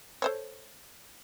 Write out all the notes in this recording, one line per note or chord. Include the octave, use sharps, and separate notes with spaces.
A4 C5 C#5